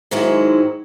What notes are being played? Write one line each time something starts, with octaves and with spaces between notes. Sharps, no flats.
G#2 D#3 F#3 G#3 E4